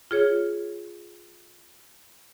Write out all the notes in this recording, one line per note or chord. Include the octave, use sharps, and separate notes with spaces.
F4 G#4 C#5